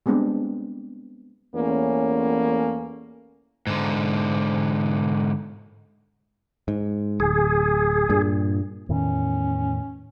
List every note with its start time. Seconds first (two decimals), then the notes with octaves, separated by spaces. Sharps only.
0.06 G3 G#3 B3 C4 D4
1.56 E2 A3 A#3 C#4
3.67 G#2 D3
6.68 G#2
7.20 D1 G#4
8.09 G2 A#2
8.89 E2 A2 D#3 C#4